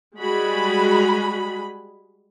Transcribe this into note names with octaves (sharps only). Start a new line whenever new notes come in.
G3 G#3 F#4 G#4 B5